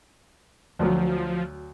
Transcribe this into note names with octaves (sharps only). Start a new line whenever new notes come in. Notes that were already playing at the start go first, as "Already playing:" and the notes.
D2 F3 F#3